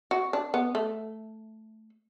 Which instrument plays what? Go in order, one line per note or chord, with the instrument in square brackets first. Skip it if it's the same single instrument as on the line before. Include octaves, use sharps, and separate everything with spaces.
[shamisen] F#4
D4
B3
A3